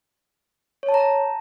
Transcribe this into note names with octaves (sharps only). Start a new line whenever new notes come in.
C#5
A5
A#5
A5